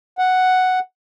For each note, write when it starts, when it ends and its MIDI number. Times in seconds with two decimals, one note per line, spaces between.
0.19 0.79 78